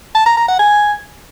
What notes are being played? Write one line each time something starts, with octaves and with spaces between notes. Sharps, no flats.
A5
A#5
A#5
F#5
G#5